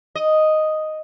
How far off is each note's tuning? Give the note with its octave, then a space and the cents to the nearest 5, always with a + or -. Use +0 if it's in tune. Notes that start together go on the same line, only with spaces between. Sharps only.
D#5 +0